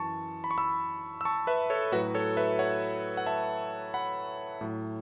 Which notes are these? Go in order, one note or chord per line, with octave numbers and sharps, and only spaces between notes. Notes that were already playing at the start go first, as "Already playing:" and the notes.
Already playing: F#2 E3 A5 C#6
B5
C#6
B5 E6
E6
A5 C#6
B4 E5
A4 C#5
A2 F#3 F#4 B4
A4 C#5
B4 E5
C#5 F#5
F#5
E5 A5
F#5 B5
A2 F#3